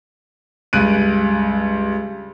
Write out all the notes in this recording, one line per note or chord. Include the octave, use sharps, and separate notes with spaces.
C#2 G2 F#6 D7 D#7